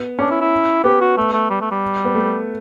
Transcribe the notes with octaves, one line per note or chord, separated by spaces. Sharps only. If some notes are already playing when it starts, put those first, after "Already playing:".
Already playing: B3
C#4 D4
E4
E4
B3 G4
F#4
A3
A3
G3
A3
G3
B3
A3